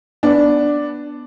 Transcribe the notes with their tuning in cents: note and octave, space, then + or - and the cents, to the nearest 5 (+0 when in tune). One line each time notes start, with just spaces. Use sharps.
B3 +0 D4 +0